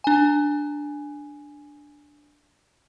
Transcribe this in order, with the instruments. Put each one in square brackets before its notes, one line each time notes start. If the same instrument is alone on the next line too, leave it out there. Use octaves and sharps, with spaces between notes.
[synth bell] D4 G#5